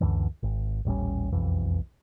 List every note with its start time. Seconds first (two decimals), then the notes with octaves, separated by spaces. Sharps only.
0.01 C#2 F#2 D3 E3
0.43 G#1
0.85 D#1 A1 G3 C#4
1.32 E1 B1 F2 E3